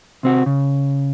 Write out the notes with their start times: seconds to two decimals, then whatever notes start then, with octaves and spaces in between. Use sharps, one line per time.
0.23 C3 C4 F#4
0.46 C#3